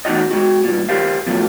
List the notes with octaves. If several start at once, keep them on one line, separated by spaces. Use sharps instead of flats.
E2 A2 D#4 F#4 D#5
G#3 F#4
G2 A#2
G4 A#4 C5 F5
B2 F3 F#3 A3